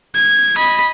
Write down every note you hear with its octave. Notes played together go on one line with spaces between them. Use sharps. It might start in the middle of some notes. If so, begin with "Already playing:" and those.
G#6
D#5 B5